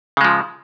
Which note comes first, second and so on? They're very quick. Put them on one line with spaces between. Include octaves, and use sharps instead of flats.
C#3 G#3 F3